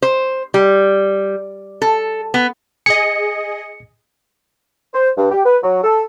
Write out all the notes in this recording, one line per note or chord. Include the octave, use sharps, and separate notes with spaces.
C5
G3
A4
B3
G#4 D#5 C#7
C5
G2
G4
B4
F#3
A4